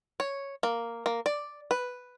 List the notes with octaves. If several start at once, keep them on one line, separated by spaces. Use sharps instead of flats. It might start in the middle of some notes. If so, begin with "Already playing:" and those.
C#5
A#3
A#3
D5
B4